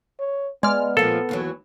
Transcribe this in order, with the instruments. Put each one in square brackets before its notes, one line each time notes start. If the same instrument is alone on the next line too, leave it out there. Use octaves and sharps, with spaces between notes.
[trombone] C#5
[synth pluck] G#3 F6 [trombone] B3 [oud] D5
[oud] A#2 F3 A#3 [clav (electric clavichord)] A4
[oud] D#2 E3 F#3